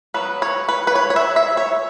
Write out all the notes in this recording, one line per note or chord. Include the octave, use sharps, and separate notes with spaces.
F#3 B3 B4
C#5
B4
B4
C#5
C#5
E5
E5
C#5